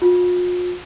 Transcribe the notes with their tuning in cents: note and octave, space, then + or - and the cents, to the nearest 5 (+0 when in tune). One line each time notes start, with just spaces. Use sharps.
F4 +45